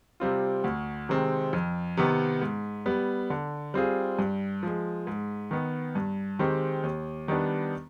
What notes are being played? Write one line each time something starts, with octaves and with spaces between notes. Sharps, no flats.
C3 G3 C4 F4
D2
C3 D#3 G#3 C4
F2
C3 D#3 B3
G#2
G3 B3
D3
G3 C4 F4 G#4
G2
F3 G#3
G#2
D#3 B3
G2
D#3 G#3 C4 G4
D#2
D#3 G3 B3 D4